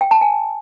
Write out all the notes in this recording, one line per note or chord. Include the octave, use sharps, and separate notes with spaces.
G5
A5
G#5